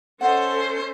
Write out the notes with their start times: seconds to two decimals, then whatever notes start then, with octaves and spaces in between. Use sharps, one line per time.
0.21 C#4 A4 C5 D#5 F#5